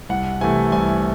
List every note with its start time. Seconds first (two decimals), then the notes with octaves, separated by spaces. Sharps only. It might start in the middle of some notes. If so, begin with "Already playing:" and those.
0.09 C2 F#5
0.41 C3 E3 A3 G#5
0.72 C2 G#5